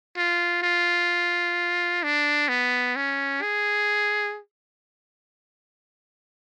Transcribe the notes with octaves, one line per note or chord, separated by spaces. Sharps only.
F4
F4
D4
B3
C#4
G#4